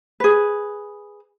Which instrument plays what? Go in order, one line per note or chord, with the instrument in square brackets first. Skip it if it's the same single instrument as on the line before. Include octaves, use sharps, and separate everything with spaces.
[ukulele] G#4 B4